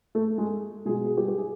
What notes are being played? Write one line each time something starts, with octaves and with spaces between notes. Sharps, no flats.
A3 A4
G#3 G#4
B2 F#3 G#3 G#4
G#4
G3 G4
G4
G#4